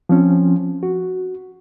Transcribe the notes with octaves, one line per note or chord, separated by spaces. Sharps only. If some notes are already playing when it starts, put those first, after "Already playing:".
F3 C4 C#4
F#4